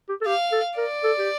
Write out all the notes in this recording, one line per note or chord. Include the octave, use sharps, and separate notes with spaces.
G4
A4
G4 F5
A4
A#4 D5
A4
G4